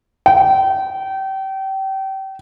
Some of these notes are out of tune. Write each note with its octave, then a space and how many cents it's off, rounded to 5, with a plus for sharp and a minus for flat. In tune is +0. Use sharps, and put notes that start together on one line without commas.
G5 -30